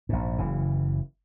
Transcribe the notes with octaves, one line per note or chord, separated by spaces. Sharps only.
A#1 G#2
F#1 C#3 E3